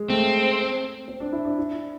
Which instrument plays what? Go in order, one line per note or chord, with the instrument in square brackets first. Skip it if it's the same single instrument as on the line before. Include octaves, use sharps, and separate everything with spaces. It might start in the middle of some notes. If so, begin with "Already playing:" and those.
Already playing: [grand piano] G#3
[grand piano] A3 [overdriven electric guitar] C4
[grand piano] C4
D4
E4
D4
E4